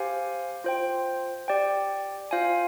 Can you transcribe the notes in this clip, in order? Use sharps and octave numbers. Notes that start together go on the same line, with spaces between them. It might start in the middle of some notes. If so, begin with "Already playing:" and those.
Already playing: G4 C5 F5 G#5
F4 C5 G5
G4 D5 G5
F4 C5 F5 G#5